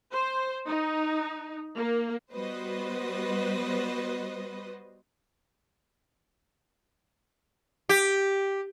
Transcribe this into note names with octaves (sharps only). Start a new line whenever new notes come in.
C5
D#4
A#3
G3 B3 F#4 B4 C5 D#5
G4